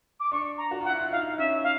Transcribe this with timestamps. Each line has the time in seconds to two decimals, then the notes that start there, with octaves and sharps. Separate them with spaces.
0.20 D6
0.32 D4 C#6
0.58 A#5
0.71 F#4
0.81 F4 F#5
0.89 E4
0.99 F4
1.11 D#4 F5
1.38 C#4 E5
1.64 F5